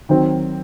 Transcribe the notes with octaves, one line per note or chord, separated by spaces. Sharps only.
D#3 F#3 C4